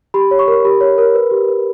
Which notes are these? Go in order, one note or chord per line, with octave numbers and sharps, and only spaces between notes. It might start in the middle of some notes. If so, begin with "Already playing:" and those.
G4 B5
C#5
C#6
A#4
G4 B5
C#5
A#4
B4
G4
B4